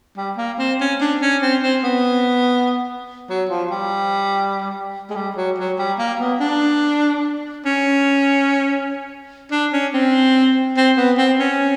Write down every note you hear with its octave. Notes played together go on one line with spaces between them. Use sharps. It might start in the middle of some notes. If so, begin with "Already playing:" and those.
G3
A#3
C4
C#4
D4
C#4
C4
C4
B3
F#3
F3
G3
G#3
G3
F#3
F#3
G3
A#3
B3
D4
C#4
D4
C#4
C4
C4
B3
C4
C#4